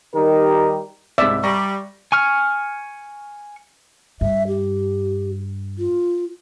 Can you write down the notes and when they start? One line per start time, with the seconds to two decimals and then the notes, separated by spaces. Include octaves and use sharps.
0.14 D#3 G3 D#4 G4 A#4
1.18 C2 G#2 D5 E5
1.43 G3 A#5 C#6 A#6
2.12 G#5 C#6 F6
4.21 G2 E5
4.47 G4
5.79 F4